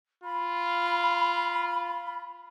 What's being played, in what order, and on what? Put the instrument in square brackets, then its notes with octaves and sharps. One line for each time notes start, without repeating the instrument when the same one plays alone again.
[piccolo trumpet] F4 [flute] B5